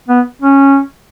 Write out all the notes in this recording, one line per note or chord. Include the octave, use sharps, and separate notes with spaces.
B3
C#4